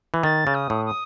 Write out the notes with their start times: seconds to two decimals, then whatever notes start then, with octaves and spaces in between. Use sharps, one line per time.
0.14 E3
0.23 D#3 A6
0.47 C#3
0.54 D#6
0.70 A2
0.85 D#6